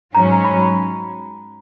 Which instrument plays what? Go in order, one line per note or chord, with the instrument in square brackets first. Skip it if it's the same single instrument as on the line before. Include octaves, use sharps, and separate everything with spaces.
[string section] G#2 F#3 C#4 [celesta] A#5
[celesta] B5